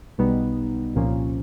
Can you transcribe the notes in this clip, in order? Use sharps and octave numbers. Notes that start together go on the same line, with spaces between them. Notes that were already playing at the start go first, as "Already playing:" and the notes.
B1 B2 G3 B3 D#4
C2 A#2 F3 A#3 C#4